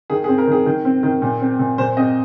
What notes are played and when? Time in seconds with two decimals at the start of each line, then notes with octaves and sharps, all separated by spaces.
0.10 D#3 G#4
0.24 G#4
0.28 C4
0.38 A#4
0.47 D#3 G#4
0.66 D#3
0.85 C4
1.03 D#3
1.22 A#2
1.41 C4
1.59 A#2
1.78 A#2 C5
1.97 C4 D#5